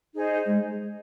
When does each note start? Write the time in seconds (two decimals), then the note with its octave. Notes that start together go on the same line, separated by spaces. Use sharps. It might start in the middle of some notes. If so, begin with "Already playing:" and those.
0.14 D#4 G#4 C5 D#5
0.46 G#3